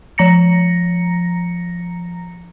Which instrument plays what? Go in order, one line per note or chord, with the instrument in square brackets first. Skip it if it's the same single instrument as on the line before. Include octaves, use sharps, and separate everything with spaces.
[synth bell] F3 A#5 A#6 C#7